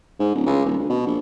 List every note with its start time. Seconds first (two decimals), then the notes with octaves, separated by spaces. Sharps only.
0.20 G#2
0.35 D1
0.46 C#2
0.65 D#1
0.78 D2
0.90 B2
1.07 A#1